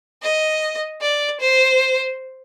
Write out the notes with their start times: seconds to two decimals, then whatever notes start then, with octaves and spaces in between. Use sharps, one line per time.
0.23 D#5
1.02 D5
1.41 C5